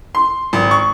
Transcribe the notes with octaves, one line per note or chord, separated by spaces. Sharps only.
C6
G#1
C#6